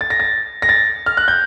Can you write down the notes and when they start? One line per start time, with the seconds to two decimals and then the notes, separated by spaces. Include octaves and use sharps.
0.01 A6
0.10 A#6
0.20 A6
0.62 A#6
0.69 A6
1.06 F6
1.17 F#6
1.28 G6